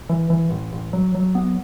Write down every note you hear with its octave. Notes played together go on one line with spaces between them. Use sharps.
E3
E3
A1
A1
F#3
F#3
B3